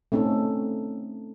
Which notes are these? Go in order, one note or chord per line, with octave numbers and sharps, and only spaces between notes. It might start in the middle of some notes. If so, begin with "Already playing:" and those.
A3 C4 C#4 D#4 A4